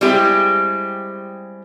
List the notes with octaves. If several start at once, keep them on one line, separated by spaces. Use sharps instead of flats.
G3 G#3 C4 E4 G4